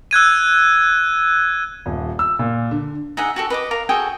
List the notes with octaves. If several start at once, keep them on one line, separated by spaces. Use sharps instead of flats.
E6 F#6 G#6 D#7
D#1
E6
A#2
D3
D#4 G#4 E5 F#5
F#4 G4 A4
B4 D#5 D6
A#4 F5 A#5
F#4 G#4 A4 G5